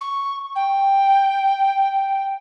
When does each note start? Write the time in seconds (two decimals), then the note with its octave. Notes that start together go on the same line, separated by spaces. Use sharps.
0.01 C#6
0.55 G5